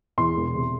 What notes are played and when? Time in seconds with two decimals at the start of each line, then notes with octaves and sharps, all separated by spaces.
0.18 E2 C6
0.37 E1
0.55 C3